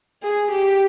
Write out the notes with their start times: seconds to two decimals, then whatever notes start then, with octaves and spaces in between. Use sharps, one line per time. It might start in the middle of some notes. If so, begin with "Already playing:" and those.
0.23 G#4
0.51 G4